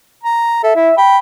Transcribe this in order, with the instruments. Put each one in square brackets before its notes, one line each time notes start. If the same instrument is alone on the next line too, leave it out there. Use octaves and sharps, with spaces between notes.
[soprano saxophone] A#5
[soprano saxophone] A4 [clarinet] E5
[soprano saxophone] E4 [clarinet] E5
[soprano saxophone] G5 [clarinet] B5